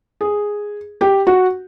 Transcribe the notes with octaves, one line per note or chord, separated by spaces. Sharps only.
G#4
G4
F#4